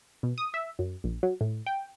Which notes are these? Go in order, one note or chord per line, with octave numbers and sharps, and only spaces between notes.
B2
D#6
E5
F#2
A#1
F#3
A2
G5